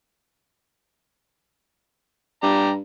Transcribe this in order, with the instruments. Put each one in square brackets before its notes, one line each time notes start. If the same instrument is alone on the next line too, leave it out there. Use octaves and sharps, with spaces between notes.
[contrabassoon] G2 [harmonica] G4 D5 A#5